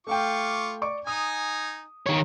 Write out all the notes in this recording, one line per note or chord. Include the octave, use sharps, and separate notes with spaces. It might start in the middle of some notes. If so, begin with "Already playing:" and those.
A3 F4 F5 G5 C#6 D6
D5 C#6 D6
D#4 G#5 A#5 D#6
D#3 C#5